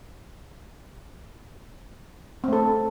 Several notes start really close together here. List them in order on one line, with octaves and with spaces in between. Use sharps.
C4 A3 A4